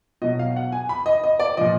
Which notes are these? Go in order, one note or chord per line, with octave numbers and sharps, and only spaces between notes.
B2 F#3 D#5
F5
F#5
G#5
B5
D#5
D#5
D5
A#2 F3 D#5